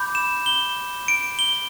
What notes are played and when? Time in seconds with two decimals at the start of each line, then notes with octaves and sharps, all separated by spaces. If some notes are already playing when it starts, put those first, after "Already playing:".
Already playing: B5 D6 G6
0.15 E7
0.46 G7
1.08 D7
1.39 G7